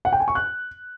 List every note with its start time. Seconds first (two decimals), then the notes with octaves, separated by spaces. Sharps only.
0.05 F#5
0.13 G5
0.20 G#5
0.28 C#6
0.35 F#6